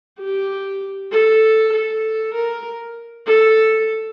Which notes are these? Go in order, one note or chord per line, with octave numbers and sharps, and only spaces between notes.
G4
A4
A4
A#4
A4